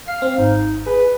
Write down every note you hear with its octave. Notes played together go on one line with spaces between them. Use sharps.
F5 C7
C4
G#1 D#4
G#4 B4